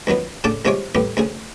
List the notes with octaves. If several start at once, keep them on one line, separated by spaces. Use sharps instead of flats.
C#2 D#3 F#3 B3
A2 C#3 D4 D5 A5 D6
C2 C3 G#3 F4 C#5 D6
C2 A2 B3 G4
D2 C#3 G#4